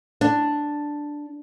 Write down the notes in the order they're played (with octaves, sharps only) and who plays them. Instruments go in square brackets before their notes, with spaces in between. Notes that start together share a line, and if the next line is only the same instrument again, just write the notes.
[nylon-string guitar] D4